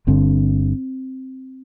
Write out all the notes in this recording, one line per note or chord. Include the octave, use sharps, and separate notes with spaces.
G1 G2 D3 C4